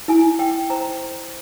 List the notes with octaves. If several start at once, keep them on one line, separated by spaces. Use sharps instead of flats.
E4 G#5
G5
C5 A#5